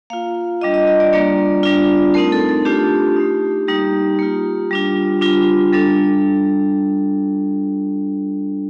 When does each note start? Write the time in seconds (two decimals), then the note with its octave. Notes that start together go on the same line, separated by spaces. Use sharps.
0.10 A#3 F4 F5
0.61 G3 D4 F4 D#5
0.74 D#5
0.87 D#5
1.00 D5
1.13 G3 A#3 D4 F4 D5
1.63 G3 D4 F4
2.14 A3 C4 D#4 A#4
2.32 A4
2.49 A4
2.65 A3 D4 F4 G4
3.16 A3 D#4
3.67 G3 A#3 D#4 G4
4.19 A#3 F4
4.71 G3 D4 F4
5.21 G3 D4 F4
5.73 G3 D4 A4